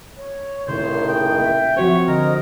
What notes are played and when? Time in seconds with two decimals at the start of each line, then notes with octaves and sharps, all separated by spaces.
0.17 C#5
0.68 C#2 A2 C3 D#3 C5
1.08 G#4 G5
1.40 A#3 E5
1.77 F3 C4 F#4 C5 C#5
2.08 D3 A#4 D#5